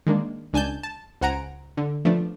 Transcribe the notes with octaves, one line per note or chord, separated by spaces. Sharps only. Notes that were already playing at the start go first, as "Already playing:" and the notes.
D#3 G#3 A#3 D4
C#2 D4 G#5 A5 G6
A5
C#2 C5 F#5 G#5 A#5 D7
D3
F3 A3 B3 D4